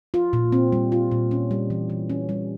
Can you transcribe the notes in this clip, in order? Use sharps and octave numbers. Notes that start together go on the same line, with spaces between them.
F4
A#2
C4
G3
F4
A#2
C#4
G3
E3
E3
C#4
G3